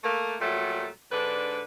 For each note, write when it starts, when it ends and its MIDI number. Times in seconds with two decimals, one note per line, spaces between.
0.03 0.34 57
0.03 0.34 58
0.40 0.87 46
0.40 0.87 54
0.40 0.87 55
0.40 0.87 57
1.11 1.61 44
1.11 1.61 50
1.11 1.61 62
1.11 1.61 71